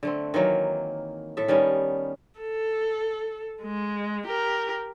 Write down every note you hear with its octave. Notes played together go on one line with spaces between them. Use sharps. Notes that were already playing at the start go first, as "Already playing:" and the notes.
D3 A3 C4
D#3 E3 F#3 A#3
A2 A4 E5
D#3 G3 B3 C#4
A4
G#3
G4 A#4